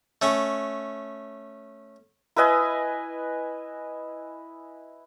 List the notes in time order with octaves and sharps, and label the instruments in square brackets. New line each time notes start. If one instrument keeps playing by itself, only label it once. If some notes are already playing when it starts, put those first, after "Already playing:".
[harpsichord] A3 C#4
[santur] E4 B4 D#5 G#5